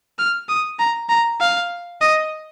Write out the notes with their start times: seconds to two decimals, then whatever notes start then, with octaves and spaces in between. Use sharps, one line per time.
0.19 F6
0.49 D#6
0.79 A#5
1.09 A#5
1.40 F5
2.01 D#5